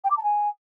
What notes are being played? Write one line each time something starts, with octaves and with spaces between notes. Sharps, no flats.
G5
D6
A5
G#5